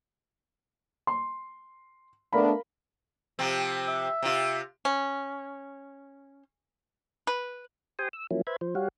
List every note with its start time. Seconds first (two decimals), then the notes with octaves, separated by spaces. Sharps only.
1.07 C6
2.33 A3 B3 D4 A#4 F5 B5
3.39 C3 F3 C4
3.88 E5
4.22 C3 F4
4.85 C#4
7.27 B4
7.99 G4 C5 G5 G#5 C6 D#6
8.13 E6
8.31 F3 F#3 A#3 C#4 E4
8.47 B4 C5 E5 B5 G#6
8.61 F3 C5
8.75 G3 F#4 G4 C#5 F5 F#5